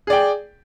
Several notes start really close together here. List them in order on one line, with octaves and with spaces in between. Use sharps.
G#4 D5 G5